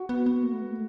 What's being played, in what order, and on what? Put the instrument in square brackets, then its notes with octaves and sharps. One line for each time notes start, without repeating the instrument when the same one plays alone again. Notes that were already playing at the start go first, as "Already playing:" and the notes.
Already playing: [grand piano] F#4
[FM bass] B3
B3
A#3
A3
G#3
A3